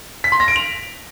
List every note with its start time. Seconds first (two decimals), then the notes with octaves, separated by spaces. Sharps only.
0.24 B6
0.32 C6
0.40 A#6
0.48 D7
0.56 F7